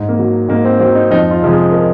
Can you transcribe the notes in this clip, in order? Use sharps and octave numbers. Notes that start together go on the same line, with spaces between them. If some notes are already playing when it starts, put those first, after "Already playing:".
Already playing: G#2
A#3
F#3
G#2 A#3
C4
F#3 C4
D#4
F2 D#4
F4
C3 F3 G#3
G#4
A#4